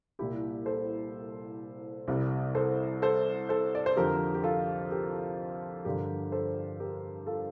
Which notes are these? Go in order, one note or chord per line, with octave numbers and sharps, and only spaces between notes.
C2 A#2 G3 E4 G4
A4 C5
C2 C3 G3
A4 C5
A4 C5
A4 C5
D5
C5
F2 D3 F3 G4 A#4
G4
F4 A4
G4 A#4
G2 D3 F3 G4 A#4
A4 C5
G4 A#4
F4 A4